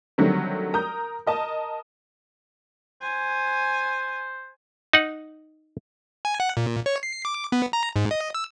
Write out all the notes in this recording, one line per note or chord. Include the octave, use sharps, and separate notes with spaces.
D3 D#3 F#3 G3 A3 C4
A#4 A#5 D#6 G6
A#4 D#5 A5
C5 G#5
D#4 F#5
G#5
F#5
A#2
C#5
C7
D6
B3
A#5
G#2
D#5
E6